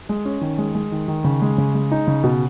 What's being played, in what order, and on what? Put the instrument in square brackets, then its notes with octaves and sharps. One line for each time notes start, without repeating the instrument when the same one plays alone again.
[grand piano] G#3
C#4
D#3
G#3
G#3
D#3
D#3
C#3
G#3
C#3
G#3
D#4
C#3
B2